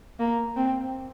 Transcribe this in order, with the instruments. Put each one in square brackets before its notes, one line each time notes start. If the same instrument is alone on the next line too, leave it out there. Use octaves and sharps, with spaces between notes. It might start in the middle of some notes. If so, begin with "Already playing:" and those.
[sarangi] A#3
C4